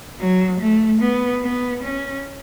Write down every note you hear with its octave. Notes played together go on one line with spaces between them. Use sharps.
F#3
A3
B3
B3
C#4